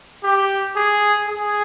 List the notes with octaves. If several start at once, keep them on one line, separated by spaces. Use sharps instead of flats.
G4
G#4
G#4